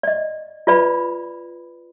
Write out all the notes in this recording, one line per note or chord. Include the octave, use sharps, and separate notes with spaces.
D5 D#5
F4 B4 D5 B5